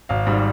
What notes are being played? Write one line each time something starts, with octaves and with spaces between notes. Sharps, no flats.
G#1 F5
G#2 G3